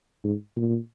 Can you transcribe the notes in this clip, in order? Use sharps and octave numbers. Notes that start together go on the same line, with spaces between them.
G#2
A#2